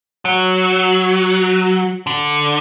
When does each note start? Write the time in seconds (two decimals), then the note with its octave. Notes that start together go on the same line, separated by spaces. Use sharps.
0.25 F#3
2.07 D3